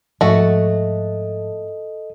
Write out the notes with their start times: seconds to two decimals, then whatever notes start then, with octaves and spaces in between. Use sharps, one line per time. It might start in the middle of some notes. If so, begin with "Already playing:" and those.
0.21 G#2 F3 A3 F#4 A4 D#5